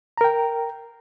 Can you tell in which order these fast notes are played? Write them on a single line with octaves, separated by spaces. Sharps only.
A#5 A#4 G5